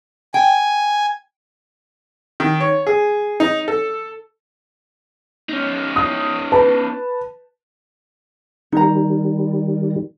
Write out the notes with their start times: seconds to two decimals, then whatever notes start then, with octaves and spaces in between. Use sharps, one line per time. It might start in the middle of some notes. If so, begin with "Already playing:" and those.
0.34 G5 G#5
2.40 D#3
2.60 C#5
2.87 G#4
3.40 D#4
3.68 A4
5.49 C#4 D#4
5.96 D#6
6.52 B4 A5
8.72 D#3 G3 D#4 A#5